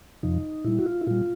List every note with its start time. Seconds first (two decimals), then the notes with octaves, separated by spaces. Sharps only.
0.23 F2 C3 F3 D#4
0.64 A#2 G3 E4
0.79 F#4
0.86 F4
1.01 E4
1.07 A#2 G3 F4